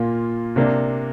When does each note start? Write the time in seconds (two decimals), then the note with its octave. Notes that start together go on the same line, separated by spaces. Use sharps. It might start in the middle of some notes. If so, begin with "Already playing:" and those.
Already playing: A#2 A#3 F4
0.56 C3 A#3 D4